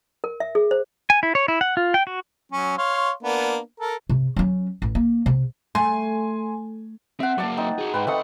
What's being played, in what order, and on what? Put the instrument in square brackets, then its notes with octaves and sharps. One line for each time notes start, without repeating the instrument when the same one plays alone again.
[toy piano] A#4
E5
G#4
C5
[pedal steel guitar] G#5
E4
C#5
E4
F#5
F4
G5
F#4
[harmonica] F#3 C#4
C#5 F5 C6
A#3 B3 D4
A4 A#4
[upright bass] C3
F#3 C#4
A1
A#3
C3
[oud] A3 [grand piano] G#5 C6
[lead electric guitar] C4 [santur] E5 F#5
[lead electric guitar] F#3 A#3 [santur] D5 A5
[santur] C4 D#4
[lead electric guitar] F#4 G#4
[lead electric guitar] G#2 [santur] B4 G5
[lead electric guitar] C#2 F#5 [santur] A3 C4 D#5